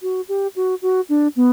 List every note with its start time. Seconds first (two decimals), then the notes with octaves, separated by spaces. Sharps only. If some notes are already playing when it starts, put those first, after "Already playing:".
0.02 F#4
0.29 G4
0.56 F#4
0.82 F#4
1.09 D4
1.36 B3